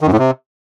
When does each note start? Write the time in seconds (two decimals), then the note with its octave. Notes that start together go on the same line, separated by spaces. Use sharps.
0.01 D#3
0.07 F#2
0.13 A2
0.19 C3